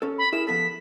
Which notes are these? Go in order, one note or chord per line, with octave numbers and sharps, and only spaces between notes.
C#4 A4
B5
E4 G#4 A#4 E7
F3 B3 A4 B6